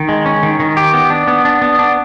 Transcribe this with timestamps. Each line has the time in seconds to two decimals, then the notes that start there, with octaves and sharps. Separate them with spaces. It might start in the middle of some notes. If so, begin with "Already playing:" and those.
Already playing: D#3
0.09 G#3
0.26 C#4
0.43 D#3
0.60 D#3
0.77 G4
0.93 B3
1.10 D4
1.27 B3
1.45 D4
1.62 B3
1.79 D4